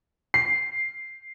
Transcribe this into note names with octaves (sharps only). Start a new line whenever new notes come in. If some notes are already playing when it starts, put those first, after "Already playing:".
C7